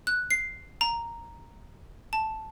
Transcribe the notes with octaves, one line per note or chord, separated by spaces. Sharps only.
F#6
C7
A#5
A5